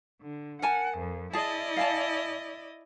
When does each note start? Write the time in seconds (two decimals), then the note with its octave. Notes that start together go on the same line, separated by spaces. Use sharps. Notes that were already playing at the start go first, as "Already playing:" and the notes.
0.20 D3
0.62 A#4 F#5 G#5 A5
0.99 F2
1.33 E4 G#4 D5 D#5 A5
1.77 F5 G#5 A5